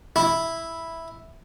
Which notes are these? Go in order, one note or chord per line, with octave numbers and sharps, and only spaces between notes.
E4